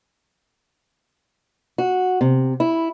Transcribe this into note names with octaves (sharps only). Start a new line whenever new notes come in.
F#4
C3
E4